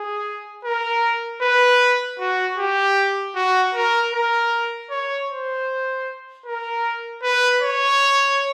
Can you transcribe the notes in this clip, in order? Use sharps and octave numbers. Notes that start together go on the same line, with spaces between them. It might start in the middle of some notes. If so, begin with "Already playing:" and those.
Already playing: G#4
A#4
B4
F#4
G4
F#4
A#4
A#4
C#5
C5
A#4
B4
C#5